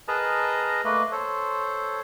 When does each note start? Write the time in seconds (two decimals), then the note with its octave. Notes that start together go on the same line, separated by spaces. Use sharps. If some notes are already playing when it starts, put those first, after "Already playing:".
0.08 G#4 A#4 B4 D#5 A5 A#5
0.85 A3 A#3 B4 D#5
1.12 A4 C5 C#5